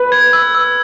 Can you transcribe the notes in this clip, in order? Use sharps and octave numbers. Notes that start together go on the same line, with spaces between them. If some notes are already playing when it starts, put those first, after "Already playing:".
Already playing: B4
G#6
E6
E6